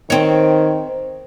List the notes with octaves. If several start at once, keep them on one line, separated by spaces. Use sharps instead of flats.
D#3 C4 C#5